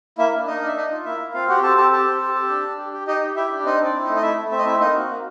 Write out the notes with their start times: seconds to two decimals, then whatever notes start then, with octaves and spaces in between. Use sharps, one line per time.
0.18 A#3 E4 E5
0.33 D4
0.47 A#3 D#4 D#5
0.61 D4
0.67 E5
0.76 D4 D#4 D#5
0.91 F4
1.05 A#3 E4 E5
1.20 A#3
1.34 C4 F4 F5
1.48 F#4 G4 F#5
1.63 C4 A4 A5
1.77 G4 A4 A5
1.91 G4 A4 A5
2.07 C4
2.20 G4
2.35 G4
2.49 D4
2.65 D4
2.79 G4
2.93 G4
3.07 D#4 G4 D#5
3.21 G4
3.36 E4 G4 E5
3.50 D4
3.65 C4 D#4 D#5
3.80 C4 D4 D5
3.94 E4
4.04 A3 D#4 D#5
4.16 D#5
4.22 E4 E5
4.37 A3
4.51 C4 E5
4.58 D#5
4.65 C4 E4 E5
4.80 A#3 D#4 D#5
4.95 F#4
5.10 A#3